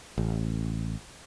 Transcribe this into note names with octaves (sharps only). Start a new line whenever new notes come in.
A1